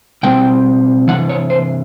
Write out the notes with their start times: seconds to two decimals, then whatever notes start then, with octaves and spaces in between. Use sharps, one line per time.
0.23 B2 G3 C4 G5
1.08 C3 E3 F#5
1.29 C#5
1.50 C5